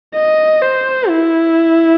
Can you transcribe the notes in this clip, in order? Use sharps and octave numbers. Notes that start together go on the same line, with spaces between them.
D#5
C5
E4